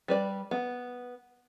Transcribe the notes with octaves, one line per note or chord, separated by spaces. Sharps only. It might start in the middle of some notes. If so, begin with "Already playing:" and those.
G3 B4 D5
B3